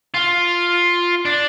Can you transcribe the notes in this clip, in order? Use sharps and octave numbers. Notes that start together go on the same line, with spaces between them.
F4
D4